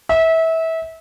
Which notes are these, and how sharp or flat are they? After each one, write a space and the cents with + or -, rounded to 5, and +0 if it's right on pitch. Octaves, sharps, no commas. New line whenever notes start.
E5 -25